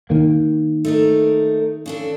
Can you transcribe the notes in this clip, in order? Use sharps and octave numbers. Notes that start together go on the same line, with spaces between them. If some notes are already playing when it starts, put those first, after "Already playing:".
D#3 A#3
A3 D#4 A#4
C#3 D4 A4